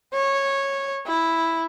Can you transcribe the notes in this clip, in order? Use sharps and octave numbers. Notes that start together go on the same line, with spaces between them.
C#5
E4